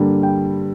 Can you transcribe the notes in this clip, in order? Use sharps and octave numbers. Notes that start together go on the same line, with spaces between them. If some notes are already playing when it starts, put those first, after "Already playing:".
Already playing: G2 D3 G3 A#3
G5